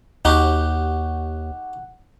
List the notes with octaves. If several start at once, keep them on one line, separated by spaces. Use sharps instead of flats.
D#2 D#4 F#4 G4 F#5